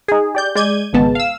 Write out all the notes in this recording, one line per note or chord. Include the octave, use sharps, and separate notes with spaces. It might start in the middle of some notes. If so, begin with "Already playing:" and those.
D#4 G#4
G4 D5 G6
G#3 D5 G6 G#6 D#7
G#1 C#2 G#3 B3 A5
F5 E6